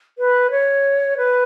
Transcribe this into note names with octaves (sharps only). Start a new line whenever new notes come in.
B4
C#5
B4